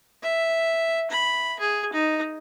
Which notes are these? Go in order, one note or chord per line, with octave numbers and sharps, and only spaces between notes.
E5
B5
G#4
D#4